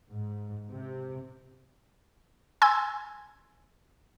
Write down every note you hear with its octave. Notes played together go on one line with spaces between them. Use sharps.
G#2
C3
G#5 C6 E6 G#6